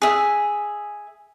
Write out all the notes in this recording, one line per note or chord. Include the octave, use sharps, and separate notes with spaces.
G#4 E5